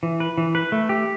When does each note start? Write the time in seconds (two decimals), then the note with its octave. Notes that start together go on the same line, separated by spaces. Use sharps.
0.03 E3
0.20 B4
0.38 E3
0.55 B4
0.72 A3
0.89 G4